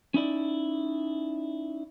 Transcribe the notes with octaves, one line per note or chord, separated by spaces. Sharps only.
C#4 D#4 E4 D5